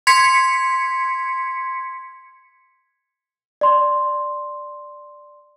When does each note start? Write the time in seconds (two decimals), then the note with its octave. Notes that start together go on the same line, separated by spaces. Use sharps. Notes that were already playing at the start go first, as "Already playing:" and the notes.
0.07 C6 G#6 B6 C#7
3.61 D5 C6